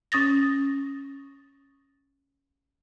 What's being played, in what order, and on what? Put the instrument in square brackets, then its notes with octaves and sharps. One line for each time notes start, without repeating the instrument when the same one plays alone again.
[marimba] C#4 D#6 A6 A#6